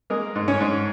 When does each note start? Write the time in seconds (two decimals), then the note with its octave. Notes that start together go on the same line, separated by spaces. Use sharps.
0.10 G#3 A#3 A#4
0.35 G#2
0.48 C#4 C#5
0.60 G#2